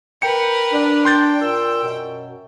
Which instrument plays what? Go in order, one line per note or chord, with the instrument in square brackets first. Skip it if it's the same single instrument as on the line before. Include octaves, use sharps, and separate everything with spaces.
[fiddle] A#4 B4 [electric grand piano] G5 C#7
[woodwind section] D4
[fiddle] G5 [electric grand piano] C6 G6 A6
[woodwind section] A#2 E6
F#2 B2